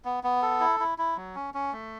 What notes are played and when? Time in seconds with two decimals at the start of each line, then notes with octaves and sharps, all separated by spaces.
0.05 B3
0.24 B3
0.42 A4
0.60 E4
0.80 E4
0.98 E4
1.16 F#3
1.35 C#4
1.54 C#4
1.72 A3